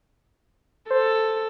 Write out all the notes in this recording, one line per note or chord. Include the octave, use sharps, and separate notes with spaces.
A4 C5